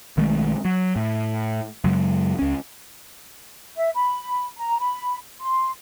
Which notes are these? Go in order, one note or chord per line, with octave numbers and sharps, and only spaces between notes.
B1 D#3 G#3 A3
F#3
A2
F#2 C#3 F#3 G#3
C#2 C#4
E5
B5
A#5
B5
C6